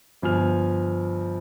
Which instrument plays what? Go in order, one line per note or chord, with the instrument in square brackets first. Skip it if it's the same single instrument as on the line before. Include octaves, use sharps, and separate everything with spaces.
[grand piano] G1 F3 G#5 F6 F7